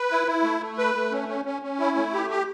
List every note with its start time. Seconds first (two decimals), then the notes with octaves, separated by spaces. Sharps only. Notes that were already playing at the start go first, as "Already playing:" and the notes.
Already playing: B4
0.11 E4
0.27 E4
0.43 A3
0.60 A3
0.78 B4
0.95 A3
1.12 C#4
1.28 C#4
1.45 C#4
1.62 C#4
1.79 E4
1.97 A3
2.14 G4
2.30 G4